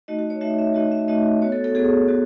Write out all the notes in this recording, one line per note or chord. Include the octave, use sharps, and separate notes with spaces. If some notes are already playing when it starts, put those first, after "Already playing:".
A3 D#4 F#4 D#5
F#4
C#5
A3 D#4 F#4 E5
E5
A3 D#4 F#4 D#5
E5
A3 D#4 F#4 D#5
B3 F#4 C#5
A4
A4
B3 F#4 G#4
B3 F#4